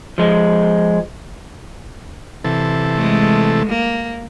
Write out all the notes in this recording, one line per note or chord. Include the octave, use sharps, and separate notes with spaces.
F3 G#3
C3 E3 A4
G#3 A3
A#3